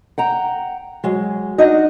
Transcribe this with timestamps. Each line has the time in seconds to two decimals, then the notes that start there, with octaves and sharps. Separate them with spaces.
0.18 F#5 G5 A#5
1.04 F#3 G#3
1.58 D4 D#4 F#4 D#5